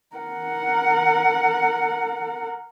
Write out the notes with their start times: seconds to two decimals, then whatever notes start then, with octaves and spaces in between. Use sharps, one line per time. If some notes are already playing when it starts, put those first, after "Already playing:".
0.16 A#4 F#5